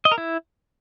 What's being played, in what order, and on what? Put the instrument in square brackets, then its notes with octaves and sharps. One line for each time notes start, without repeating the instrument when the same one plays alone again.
[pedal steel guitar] D#5
A#4
E4